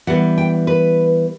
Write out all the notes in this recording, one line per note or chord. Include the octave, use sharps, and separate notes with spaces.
E3 G3 B3 F#5
G5
B4